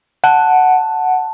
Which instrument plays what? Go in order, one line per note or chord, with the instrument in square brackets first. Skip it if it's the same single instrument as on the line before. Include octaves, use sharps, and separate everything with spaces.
[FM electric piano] F#5 [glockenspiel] A5